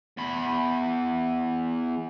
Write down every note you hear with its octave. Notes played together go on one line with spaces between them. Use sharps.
E2 B5